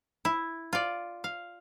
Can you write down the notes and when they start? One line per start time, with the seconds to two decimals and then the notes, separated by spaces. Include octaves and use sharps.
0.25 E4
0.73 F4 D5
1.24 F5